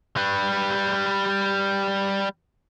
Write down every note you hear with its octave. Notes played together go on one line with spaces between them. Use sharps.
G3 B4